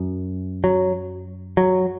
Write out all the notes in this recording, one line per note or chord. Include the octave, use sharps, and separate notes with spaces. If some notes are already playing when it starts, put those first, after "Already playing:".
Already playing: F#2
F#3
F#3